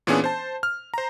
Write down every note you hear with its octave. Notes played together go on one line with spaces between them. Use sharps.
A#2 E3 B3 C#4 D4 G#4
C5 A5
F6
C5 A#5